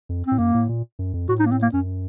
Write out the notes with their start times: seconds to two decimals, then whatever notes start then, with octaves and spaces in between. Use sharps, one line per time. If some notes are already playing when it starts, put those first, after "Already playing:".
0.09 F2
0.27 A2 C4
0.38 F#2 A#3
0.54 A2
0.69 A#2
0.99 F#2
1.13 F2
1.29 A2 F#4
1.39 D#4
1.46 A#3
1.51 C4
1.62 A#3
1.73 F#2 C#4